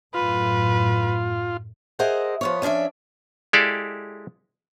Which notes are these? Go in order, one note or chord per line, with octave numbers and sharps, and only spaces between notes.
F#2 A2 F4 B4
G#4 A#4 C5 D#5 E5 F#5
F3 B3 C#5
F3 C#4 D4 D5 E5
G#3 E4 G4 A4 D5 F5